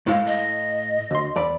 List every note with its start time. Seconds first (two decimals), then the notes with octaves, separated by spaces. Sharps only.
0.07 A2 G#3 E4 F5
0.26 D#5
1.11 D2 C6
1.36 E2 D5 B5